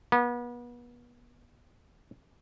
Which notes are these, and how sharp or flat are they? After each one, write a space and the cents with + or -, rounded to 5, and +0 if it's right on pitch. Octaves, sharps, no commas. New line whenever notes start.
B3 -35